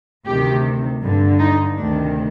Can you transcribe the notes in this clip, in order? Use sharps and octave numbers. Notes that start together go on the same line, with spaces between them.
D2 C3 D#3 G4
G2 D3
D#4
D2 C3 D#3 D4